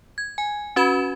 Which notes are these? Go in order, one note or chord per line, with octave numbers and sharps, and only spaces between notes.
G#6
G#5
C#4 F#4 B4 B5 G#6 E7